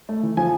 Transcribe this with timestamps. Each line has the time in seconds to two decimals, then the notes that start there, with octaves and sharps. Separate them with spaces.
0.09 A3
0.23 E3
0.37 F3 G#5